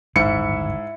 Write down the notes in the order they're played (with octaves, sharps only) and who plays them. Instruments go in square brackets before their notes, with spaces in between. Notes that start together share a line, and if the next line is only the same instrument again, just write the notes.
[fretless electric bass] D1 G1 D#3 [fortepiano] G#2 [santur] E4 [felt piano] C#7